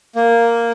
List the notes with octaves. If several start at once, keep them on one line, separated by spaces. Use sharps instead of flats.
A#3